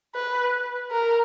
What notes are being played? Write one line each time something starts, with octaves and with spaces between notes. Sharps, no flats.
B4
A#4